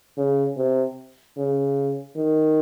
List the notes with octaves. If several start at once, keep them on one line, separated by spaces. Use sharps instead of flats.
C#3
C3
C#3
D#3